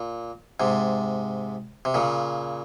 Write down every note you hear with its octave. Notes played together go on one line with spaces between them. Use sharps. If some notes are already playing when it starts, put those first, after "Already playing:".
Already playing: A#2
G#2 C3
C3
A#2 C#3